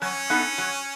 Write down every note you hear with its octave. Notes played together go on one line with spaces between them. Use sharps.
F#3 C#4
B3 D#4 A4
F#3